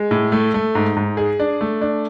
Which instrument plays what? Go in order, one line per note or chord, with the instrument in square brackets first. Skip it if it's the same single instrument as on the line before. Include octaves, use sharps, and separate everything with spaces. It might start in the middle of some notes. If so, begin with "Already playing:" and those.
Already playing: [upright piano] G#3
A2
A3
A3
G#2
G#2
G#4
D4
A3
D4